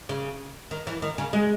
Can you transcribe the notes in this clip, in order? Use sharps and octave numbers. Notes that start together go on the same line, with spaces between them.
C#3
D#3
E3
D#3
C#3
G#3